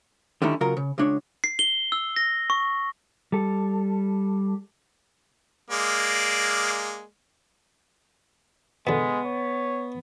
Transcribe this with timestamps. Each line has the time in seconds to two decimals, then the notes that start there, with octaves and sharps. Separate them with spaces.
0.42 D3 D#3 G3 C#4 D#4 E4
0.61 C#3 F#3 F4 A#4 A#5
0.77 C#3
0.98 C#2 G#3 D4 C#5
1.44 C7
1.59 G7
1.92 E6
2.16 A#6
2.50 C#6
3.32 G3 A4
5.70 G#3 A#3 D5
8.87 B2 D3 G#3 B3
9.26 C#5